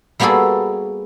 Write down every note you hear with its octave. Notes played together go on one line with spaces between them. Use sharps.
G3 A#3 B3 F#4 G#4 A4